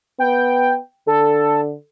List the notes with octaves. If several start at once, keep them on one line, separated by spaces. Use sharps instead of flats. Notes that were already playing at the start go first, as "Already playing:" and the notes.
B3 G5
D3 A4